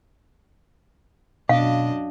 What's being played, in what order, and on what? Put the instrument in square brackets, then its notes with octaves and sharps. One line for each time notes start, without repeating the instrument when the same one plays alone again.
[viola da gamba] F#2 D4 D#5 [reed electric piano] B2 [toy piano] F5